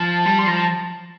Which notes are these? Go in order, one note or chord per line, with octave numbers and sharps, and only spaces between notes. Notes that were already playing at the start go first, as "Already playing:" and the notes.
Already playing: F3 A5
G3
C6
F3 A#5
A5